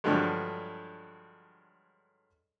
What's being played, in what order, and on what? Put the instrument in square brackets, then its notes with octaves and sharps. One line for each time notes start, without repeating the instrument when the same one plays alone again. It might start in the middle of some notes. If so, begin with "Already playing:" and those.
[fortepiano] G2 D3 F3 F#3 G#3